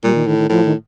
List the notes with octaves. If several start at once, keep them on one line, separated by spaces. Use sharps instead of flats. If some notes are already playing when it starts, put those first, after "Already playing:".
A#2 G3
D#3
A2 D#3
D#3
A2 F3
D#3